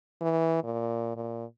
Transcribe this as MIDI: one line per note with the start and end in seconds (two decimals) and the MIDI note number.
0.21 0.63 52
0.64 1.14 46
1.16 1.45 46